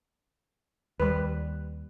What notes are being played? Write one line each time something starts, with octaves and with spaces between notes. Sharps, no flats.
D#2 G3 B4